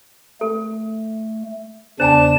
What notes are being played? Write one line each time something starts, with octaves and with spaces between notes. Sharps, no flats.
A3 A4
E2 C#3 D4 C5 D5 G#5 A5 E7